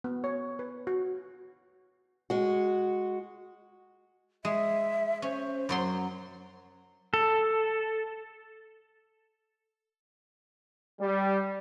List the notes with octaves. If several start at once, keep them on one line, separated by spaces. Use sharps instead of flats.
B3
C#5
B4
F#4
G#3 F#4
G#3 E5
C#4 C5
F#2 F#3 C6
A4
G3